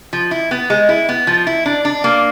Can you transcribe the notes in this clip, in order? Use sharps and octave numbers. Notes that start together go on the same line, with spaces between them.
F3
E4
B3
G#3
E4
B3
F3
E4
D4
D4
A#3